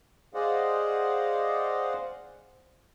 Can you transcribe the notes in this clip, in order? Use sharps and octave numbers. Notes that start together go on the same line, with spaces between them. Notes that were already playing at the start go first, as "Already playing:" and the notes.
G#4 C5 D5 D#5 F5 F#5